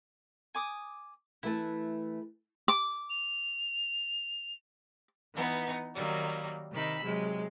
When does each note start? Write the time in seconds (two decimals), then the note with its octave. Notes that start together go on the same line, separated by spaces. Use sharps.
0.55 G#5 D6 D#6
1.43 E3 A3 E4 B4 A5
2.68 D6
3.10 F7
5.35 E3 B3 D#4
5.94 D#3 F#3 G3 A#3
6.73 C3 D#3 D#4 B5 E6
7.04 C3 F#3 G#3